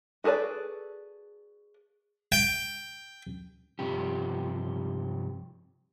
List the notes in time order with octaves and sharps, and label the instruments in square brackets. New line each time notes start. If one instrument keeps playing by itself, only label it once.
[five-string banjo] F#4 G#4 A4 B4 D5
[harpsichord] G5
[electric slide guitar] G2 C3 F3 G4